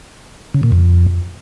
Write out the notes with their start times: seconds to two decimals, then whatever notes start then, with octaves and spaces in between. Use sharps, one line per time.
0.54 C#3
0.63 A#2
0.72 F2